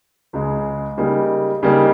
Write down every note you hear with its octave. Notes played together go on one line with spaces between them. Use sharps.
C#2 C#3 G#3
C#3 G3 A#3 D#4
C#3 G3 A#3 D#4